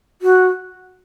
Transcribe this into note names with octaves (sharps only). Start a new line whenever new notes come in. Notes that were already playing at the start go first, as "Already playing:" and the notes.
F#4